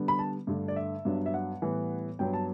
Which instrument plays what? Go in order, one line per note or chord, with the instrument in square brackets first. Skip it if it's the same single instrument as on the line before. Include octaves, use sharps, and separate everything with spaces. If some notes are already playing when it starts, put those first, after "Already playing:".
Already playing: [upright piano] D3 G3 B3
B5
A5
G2 D3 A3
D5
E5
G2 F#3 B3 D4
E5
F#5
A2 E3 G3 B3
G2 F#3 B3 G5
A5